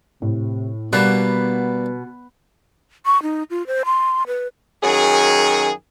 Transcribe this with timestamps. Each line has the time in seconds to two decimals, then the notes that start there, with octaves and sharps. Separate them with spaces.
0.22 A2 C3
0.93 B2 G3 A#3 B3 D4 B5 F#6
3.06 C#6
3.23 D#4
3.50 F4
3.67 C5
3.85 C6
4.27 B4
4.83 F#2 D#3 F#3 G#4